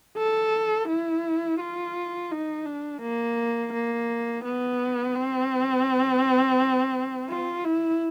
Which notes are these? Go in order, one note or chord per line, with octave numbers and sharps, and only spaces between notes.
A4
E4
F4
D#4
D4
A#3
A#3
B3
C4
F4
E4